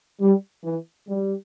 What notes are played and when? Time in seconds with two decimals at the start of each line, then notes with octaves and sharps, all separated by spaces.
0.21 G3
0.64 E3
1.09 G3